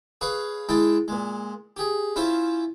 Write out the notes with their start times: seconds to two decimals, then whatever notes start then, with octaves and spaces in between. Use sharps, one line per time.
0.21 G#4 B4 C#5 F5
0.69 G#3 E4 G#4 G5 A5
1.08 A#2 G#3
1.77 G4 G#4
2.16 C#4 E4 F4 C5 E5 F5